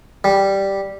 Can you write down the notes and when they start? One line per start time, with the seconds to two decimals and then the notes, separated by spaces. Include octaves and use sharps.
0.24 G3